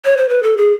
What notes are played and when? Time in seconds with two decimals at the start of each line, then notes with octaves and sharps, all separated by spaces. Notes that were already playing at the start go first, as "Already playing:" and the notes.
0.05 C#5
0.17 C5
0.29 B4
0.43 A4
0.57 G#4